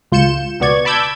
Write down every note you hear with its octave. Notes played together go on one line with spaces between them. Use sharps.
C#2 F4 G6 C#7 E7
C#2 B2 B3 D5 C#6 G#6
A5 B5 D6 E6 G6 G#6